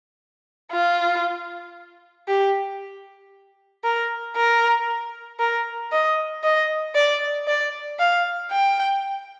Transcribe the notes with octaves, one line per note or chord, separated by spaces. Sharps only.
F4
G4
A#4
A#4
A#4
D#5
D#5
D5
D5
F5
G5